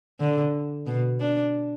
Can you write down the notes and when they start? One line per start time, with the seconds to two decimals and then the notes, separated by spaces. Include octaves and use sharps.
0.20 D3
0.87 B2
1.20 D4